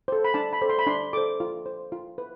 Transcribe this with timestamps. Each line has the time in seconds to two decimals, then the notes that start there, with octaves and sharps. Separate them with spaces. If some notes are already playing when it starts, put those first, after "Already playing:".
0.08 A4 C5
0.24 B5
0.34 D4 A5
0.53 B5
0.61 A4 C5
0.69 C6
0.79 B5
0.87 D4 C6
1.13 A4 C5 D6
1.40 F4
1.66 C5
1.92 F4
2.18 B4